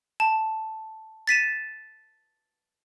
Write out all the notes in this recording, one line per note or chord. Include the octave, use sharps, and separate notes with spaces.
A5
A6 B6 D#7 E7